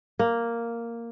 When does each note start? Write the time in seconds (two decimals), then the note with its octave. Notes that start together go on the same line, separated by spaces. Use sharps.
0.19 A#3